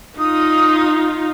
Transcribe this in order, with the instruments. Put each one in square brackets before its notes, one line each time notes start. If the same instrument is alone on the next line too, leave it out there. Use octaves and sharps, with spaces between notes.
[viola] D#4 F4 [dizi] D#6